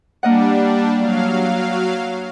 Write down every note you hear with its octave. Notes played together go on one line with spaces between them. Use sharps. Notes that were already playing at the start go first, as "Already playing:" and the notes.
G3 A#3 D4 D#5 F#5
F#3 F5